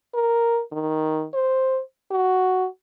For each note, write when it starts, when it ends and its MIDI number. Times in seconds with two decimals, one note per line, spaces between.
0.14 0.61 70
0.72 1.25 51
1.34 1.80 72
2.11 2.67 66